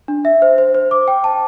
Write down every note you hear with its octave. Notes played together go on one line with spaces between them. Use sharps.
D4
E5
C5
C5
C5
D6
G5
A5